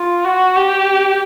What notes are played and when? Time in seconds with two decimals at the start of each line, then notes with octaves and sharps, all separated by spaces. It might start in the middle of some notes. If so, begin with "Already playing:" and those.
Already playing: F4
0.24 F#4
0.56 G4